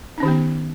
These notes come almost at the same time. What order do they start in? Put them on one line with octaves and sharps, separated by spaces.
D#4 C#4 D#3 G4 B3